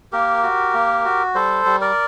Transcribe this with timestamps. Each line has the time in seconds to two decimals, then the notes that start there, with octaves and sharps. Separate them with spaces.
0.12 A#3 G4 A#4
0.43 F#4
0.74 A#3
1.05 F#4
1.34 G3 A4 C5
1.66 G3
1.81 A#4 D5